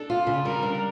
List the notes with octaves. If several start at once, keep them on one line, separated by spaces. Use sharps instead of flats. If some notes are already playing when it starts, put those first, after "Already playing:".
Already playing: D4 A4
F4
C#3
G3 A#4
D4